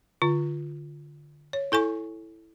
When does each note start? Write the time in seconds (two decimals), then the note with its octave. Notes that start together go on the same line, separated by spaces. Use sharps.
0.22 D3 F4
1.53 C#5
1.72 E4 A4 G#5 C#6